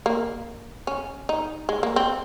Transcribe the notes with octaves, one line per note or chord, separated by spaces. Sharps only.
A#3
C#4
D#4
G#3
A#3
C4